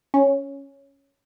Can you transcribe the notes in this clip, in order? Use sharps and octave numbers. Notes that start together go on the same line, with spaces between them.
C#4